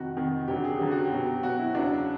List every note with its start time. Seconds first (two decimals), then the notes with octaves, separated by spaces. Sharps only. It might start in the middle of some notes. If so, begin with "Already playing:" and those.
Already playing: F2 C3 D#3 F#4
0.16 F2 C3 D#3
0.48 F#2 D3 F#3 G4
0.64 G#4
0.77 F#2 D3 F#3 G4
0.91 F#4
1.05 G4
1.11 B2 F#3
1.43 B2 F#3 F#4
1.59 E4
1.75 E2 C#3 F#3 D4